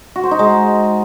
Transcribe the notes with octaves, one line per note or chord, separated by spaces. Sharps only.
F#4
C5
D#4
G#3